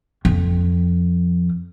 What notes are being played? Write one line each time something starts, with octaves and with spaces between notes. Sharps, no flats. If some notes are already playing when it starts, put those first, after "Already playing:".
F2